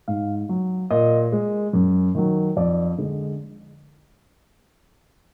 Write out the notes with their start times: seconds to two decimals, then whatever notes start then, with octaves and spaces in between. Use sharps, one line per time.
0.08 G#2 F5
0.49 F#3
0.91 A#2 D#5
1.32 G#3
1.73 F#2
2.15 D#3 F#3
2.56 F2 D5
2.98 D3 G#3